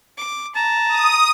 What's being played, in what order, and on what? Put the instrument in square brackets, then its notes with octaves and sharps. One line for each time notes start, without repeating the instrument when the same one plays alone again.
[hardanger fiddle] D6
[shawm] A5 [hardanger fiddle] A#5
[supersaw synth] D#6